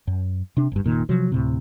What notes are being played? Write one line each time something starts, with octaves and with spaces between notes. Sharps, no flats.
F#2
C3 D4
G1 G2
F1 A#2 D#3
C3 F3 F#3
D2 A2 C3